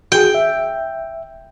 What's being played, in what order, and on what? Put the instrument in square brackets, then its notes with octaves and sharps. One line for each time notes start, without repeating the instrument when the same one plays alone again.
[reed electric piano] F#4 G#4 [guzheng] G5
[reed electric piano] E5